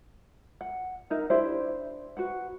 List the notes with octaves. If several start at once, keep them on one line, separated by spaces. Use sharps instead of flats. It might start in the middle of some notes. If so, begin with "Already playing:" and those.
F#5
D#4 A#4 E5
D4 E4 G4 C5
F#4 B4 F#5